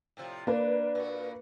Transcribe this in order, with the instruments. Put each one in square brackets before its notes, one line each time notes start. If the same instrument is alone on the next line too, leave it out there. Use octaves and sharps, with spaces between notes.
[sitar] A2 C3 F3
[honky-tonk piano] A#3 B4 [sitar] D4
[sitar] A#2 F#4